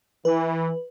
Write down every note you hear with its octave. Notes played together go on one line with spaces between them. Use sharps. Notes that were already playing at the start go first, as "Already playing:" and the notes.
E3 B4